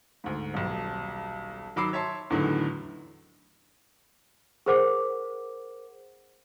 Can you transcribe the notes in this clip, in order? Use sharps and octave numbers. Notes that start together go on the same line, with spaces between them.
D2 G#2
D#1 B1
D#3 F#3 B5 D6 E6 C7
C#5 E5 A5 C6
E2 A2 D3 D#3 F#3
G#4 A#4 C5 F#5 D6